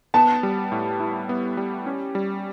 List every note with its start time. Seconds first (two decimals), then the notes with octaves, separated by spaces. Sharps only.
0.14 B3 A5
0.43 G3
0.72 A2
1.00 E4
1.29 B3
1.57 G3
1.86 C#4
2.15 G3